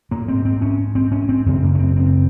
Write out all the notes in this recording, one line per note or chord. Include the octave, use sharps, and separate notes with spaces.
G#2 A#3
C4
C4
C#4
C4
C#4
C4
F#2 C#3 C4
A#3
C#4
C4
C4